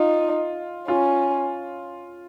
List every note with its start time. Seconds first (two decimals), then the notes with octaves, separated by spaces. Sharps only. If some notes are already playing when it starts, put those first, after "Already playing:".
Already playing: D#4 F4
0.88 C#4 F4